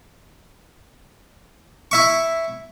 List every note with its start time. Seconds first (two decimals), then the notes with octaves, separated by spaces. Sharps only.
1.91 E4 E5 C#6